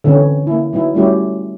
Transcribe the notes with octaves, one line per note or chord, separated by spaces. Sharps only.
D3 E3 C4 C#4
A#3 E4
F#3 B3 D#4 E4
G3 A3 C#4 E4 F#4 G4